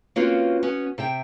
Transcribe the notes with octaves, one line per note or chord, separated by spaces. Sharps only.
A#3 C4 C#4 F4 F#4 B4
B3 C#4 F#4
C3 E5 G5